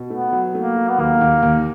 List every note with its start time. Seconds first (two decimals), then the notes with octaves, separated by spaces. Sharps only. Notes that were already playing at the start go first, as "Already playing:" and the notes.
Already playing: B2
0.10 A3 B3
0.32 F#3
0.54 A3 A#3
0.76 F#3
0.88 B3
0.98 D#2 A#3
1.21 D#2
1.43 D#2